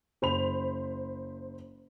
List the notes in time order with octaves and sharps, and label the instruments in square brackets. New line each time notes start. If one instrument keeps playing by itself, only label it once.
[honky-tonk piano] F#1 C5 B5 F7